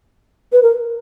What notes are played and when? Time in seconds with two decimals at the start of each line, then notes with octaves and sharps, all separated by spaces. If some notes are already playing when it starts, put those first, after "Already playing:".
0.52 B4
0.63 A#4